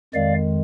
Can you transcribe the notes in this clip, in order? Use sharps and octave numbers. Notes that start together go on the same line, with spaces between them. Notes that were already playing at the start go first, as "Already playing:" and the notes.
F2 D#3 G#3 D5 F5